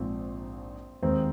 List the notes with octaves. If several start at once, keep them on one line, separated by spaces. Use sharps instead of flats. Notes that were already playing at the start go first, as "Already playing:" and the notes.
Already playing: A#1 G#2 F3 A#3 C4
D#2 D#3 G#3 C4 D#4